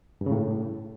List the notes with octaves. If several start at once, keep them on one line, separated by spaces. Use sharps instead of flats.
G2
C#3
A2